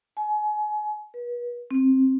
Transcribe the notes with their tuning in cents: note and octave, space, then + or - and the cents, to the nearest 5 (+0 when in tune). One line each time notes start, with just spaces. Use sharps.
G#5 +30
B4 -40
C4 +15